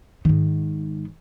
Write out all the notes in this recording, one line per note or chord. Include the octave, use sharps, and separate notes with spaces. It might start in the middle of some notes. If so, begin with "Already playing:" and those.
G#2 D#3